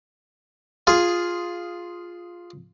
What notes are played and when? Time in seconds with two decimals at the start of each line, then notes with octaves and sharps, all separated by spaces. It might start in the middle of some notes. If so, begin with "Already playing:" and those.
0.87 F4 G#4